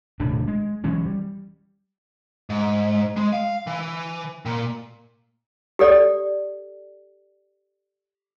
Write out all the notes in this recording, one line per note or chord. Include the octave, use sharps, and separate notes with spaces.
D#1 A2 C3 D4
G#3
E3 F#3 G#3 C#4
G3
G#2
G#3
F5
E3
A#2
G4 A4 D5